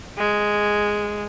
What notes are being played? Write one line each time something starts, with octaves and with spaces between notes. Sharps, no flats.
G#3